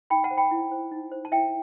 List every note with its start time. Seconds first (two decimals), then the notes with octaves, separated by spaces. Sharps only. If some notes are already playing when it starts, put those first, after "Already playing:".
0.10 D#4 G5 B5
0.24 F#5 A5
0.31 C5
0.38 G5 B5
0.51 E4
0.72 C5
0.91 D#4
1.12 C5
1.25 A5
1.32 E4 E5 G5